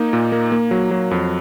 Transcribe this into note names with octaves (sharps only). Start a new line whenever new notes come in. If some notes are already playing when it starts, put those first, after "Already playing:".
Already playing: A#3 D#4
A#2
A#3
A#3
F#3
F#3
F2